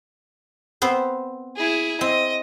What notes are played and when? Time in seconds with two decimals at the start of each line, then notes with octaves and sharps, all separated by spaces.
0.82 B3 C4 C5
1.56 E4 G#4
2.01 C4 D#5